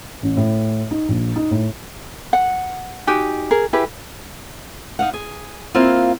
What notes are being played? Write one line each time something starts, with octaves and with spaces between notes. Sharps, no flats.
A1
A2
D#4
A#1
D#4
A2
F#5
D#4 F#4 G4 G#5
G#4 A#4
E4 G4 G#4 B4
D#4 F5 F#5
G#4
A#3 C4 E4 F4